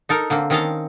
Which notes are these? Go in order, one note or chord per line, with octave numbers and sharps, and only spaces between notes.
D#4 A4 A#4
D3 A#3 C4
D#3 C4 C#4 D#5 F5 A5